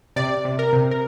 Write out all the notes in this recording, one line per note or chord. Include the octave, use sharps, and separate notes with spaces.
C3 D5
C3
A#4
C3
A#4